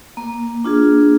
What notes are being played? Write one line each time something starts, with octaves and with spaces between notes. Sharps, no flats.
A#3
D4 F4 G#4